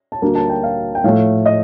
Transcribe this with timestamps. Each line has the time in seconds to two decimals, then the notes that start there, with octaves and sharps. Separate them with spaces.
0.12 A5
0.22 D2 D3 G3 A#3
0.35 A5
0.49 G5
0.63 F5
0.95 G5
1.04 A2 F3 A3 F5
1.46 D#5